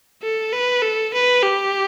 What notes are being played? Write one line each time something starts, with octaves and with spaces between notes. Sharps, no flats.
A4
B4
A4
B4
G4